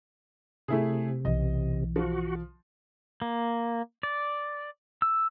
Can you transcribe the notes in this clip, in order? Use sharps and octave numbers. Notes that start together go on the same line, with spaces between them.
C3 A3 E4 G#4
B1 E3 D#5
F3 F#4
A#3
D5
E6